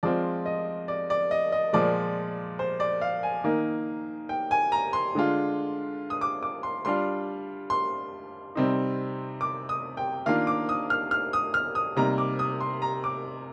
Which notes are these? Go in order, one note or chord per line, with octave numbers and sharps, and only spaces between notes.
F3 G#3 C4 F4 D5
D#5
D5
D5
D#5
D#5
A#2 F3 G#3 D5
C5
D5
F5
G#5
D#3 A#3 D#4
G5
G#5
A#5
C6
D3 G#3 D4 F4
D#6
D6
D6
C6
G3 D4 F4 C6
C6
C3 G3 C4 D#4
D6
D#6
G5
D#3 A#3 D4 F4 F5
D6
D#6
F6
F6
D#6
F6
D#6
C3 G3 A#3 D#4 A#5
D6
D#6
C6
A#5
D6